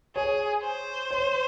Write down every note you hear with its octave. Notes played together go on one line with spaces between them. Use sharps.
G#4 C#5
C5
C#5